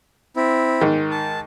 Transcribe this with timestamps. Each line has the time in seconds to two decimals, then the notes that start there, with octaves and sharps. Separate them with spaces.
0.36 C4 E4
0.81 G#2 D#3
1.11 A5